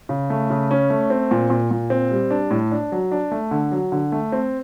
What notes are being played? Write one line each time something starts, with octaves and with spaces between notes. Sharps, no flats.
C#3
A3
C#3
C#4
A3
C4
A#2
A#2
A#2
C4
G3
D4
A2
D4
F#3
D4
A3
D3
F#3
D3
A3
C4